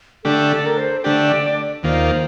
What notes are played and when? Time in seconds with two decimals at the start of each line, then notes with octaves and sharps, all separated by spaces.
0.24 D3 A3 D4 G4 A4
0.51 A4
0.66 A#4
0.78 C5
1.04 D3 A3 D4 G4 D5
1.83 D#2 D#3 A#3 F4 C5